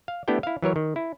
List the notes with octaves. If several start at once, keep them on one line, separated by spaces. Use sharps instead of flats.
F5
A3 B3 D4 E4 G4 G5
E4 F5
E3 F#3 A#4 C#5
D#3
E4